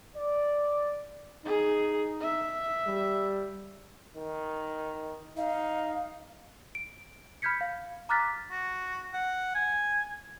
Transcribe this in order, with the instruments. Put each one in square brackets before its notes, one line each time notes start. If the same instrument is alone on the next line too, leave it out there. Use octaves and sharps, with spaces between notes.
[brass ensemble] D5
[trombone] D#4 [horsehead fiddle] G#4
[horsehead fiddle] E5
[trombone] G3
D#3
[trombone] D#4 [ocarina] F5
[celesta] D7
B5 F6 G6 G#6 B6 C#7
F5
A#5 D6 F6 F#6 A6 B6
[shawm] F#4
F#5
G#5